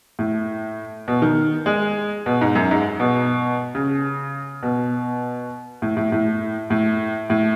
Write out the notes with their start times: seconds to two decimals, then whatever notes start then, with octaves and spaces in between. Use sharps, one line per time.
0.19 A2
1.08 B2
1.22 D#3
1.66 G#3
2.26 B2
2.41 G#2
2.55 F#2
2.71 G#2
3.00 B2
3.75 C#3
4.63 B2
5.82 A2
5.97 A2
6.12 A2
6.70 A2
7.30 A2